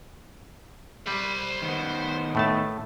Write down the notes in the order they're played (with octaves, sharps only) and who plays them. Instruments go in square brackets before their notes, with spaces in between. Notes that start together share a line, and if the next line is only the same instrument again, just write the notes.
[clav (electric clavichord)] G3 [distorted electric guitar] C5 B5
[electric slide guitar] D#3 B3
[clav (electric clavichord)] A2 A3 A5